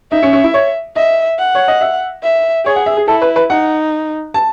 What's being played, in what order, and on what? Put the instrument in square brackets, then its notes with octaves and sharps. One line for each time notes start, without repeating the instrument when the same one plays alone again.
[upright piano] D#4 [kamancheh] E5
[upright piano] C#4
C#4
E4
C#5
[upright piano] D#5 [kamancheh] E5
[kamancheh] F#5
[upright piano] C#5
D#5
E5
[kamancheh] E5
[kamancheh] G#4 [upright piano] C#5
[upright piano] F#5
E5
G#4
[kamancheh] E4 [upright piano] A4
[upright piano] B4
B4
[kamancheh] D#4 [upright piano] F#5
[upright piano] A5